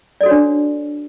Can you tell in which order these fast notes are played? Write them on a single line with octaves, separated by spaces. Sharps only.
D5 A4 F#4 C#5 D4